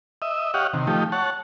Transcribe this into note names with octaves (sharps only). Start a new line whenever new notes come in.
D#5 E5
G4 C#5 D#5 F5 F#5
C3 D#3
F3 A3 D#4 G4
C#5 F#5 A5